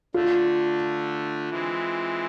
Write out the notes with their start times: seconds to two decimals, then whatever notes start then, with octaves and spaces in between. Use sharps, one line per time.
0.14 D3 A3 D4 F4
1.50 E3 G#3 C4